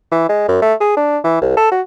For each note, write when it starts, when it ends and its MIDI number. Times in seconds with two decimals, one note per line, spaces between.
0.11 0.25 52
0.29 0.44 56
0.48 0.58 42
0.62 0.74 57
0.80 0.96 68
0.97 1.18 62
1.24 1.39 52
1.41 1.52 36
1.57 1.71 69
1.71 1.81 66